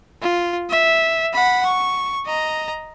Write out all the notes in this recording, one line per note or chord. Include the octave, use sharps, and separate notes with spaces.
F4
E5
F#5 B5
C#6
D#5 A#5